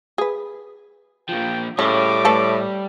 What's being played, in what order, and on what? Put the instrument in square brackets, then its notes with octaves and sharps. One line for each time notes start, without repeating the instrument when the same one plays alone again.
[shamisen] G#4 B4
[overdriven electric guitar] A#2 F3 [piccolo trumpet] G5
[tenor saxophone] A2 [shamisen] C#3 C#5 [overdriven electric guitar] G3 [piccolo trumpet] D6
[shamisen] A3 A4 B4